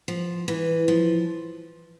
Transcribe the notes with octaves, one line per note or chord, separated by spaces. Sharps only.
F3
E3
F3